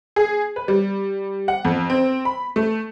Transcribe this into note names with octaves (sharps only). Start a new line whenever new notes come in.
G#4
B4
G3
F#5
F2
C4
B5
A3